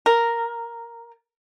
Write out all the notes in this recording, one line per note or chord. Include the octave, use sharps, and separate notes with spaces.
A#4